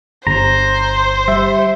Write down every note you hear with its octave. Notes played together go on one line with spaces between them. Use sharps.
G1 C5 A#5
G3 E5